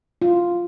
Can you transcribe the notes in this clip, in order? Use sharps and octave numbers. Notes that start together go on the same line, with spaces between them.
F4